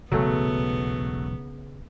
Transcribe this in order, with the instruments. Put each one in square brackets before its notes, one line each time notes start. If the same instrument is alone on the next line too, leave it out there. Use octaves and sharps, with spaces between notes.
[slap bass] E1 B1 A#2 [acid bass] C#3 [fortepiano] F#3 A3 [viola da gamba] B3